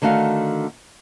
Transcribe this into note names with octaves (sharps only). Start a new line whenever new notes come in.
D3 D#3 A3 F#4 F5 F#5